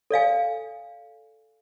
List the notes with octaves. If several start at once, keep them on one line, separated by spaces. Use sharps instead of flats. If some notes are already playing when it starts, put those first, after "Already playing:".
A4 D5 F5 G#5